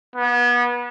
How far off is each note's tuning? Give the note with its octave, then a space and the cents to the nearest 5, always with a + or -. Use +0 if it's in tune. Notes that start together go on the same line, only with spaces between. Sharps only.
B3 -30